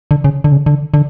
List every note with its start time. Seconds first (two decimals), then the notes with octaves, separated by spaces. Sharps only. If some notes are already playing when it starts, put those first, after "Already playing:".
0.11 D3
0.24 C#3
0.44 D3
0.52 C#3
0.66 D3
0.94 D3